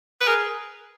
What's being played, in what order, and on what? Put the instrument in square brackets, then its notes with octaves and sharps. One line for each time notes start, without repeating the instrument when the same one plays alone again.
[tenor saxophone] B4
[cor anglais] G#4 [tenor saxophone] A#4